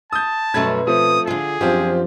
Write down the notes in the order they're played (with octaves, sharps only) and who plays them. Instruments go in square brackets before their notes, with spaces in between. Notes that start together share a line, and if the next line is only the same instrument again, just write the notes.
[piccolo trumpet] A5 [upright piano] D#6 G6
[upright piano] F#2 A3 G#6 [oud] B2 C#4 B4
[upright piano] F3 A3 C4 [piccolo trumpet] D#6
[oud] D3 F4 [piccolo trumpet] G#4
[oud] F#2 F3 D4 [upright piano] C4 F4 G4